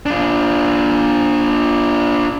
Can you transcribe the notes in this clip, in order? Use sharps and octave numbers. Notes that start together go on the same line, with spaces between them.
D4 F4